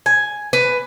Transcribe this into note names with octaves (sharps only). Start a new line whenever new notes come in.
G#5
B4